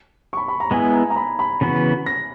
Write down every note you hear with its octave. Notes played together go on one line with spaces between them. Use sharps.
C#6
B5
B5
A#5
G#3 B3 E4 G#5
A#5
A#5
B5
B5
C#3 E3 B3 F#4
A#6